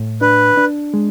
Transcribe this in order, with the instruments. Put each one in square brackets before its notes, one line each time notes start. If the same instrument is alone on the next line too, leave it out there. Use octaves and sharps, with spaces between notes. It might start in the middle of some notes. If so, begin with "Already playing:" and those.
Already playing: [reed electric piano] A2
[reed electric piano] D4 [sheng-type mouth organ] B4
[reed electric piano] D4
G#3